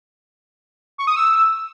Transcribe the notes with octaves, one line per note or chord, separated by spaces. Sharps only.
C#6
D#6
E6